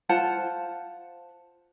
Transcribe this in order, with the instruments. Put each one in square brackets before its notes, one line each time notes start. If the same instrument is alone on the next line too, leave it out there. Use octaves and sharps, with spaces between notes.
[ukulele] F4 C5 F#5 A5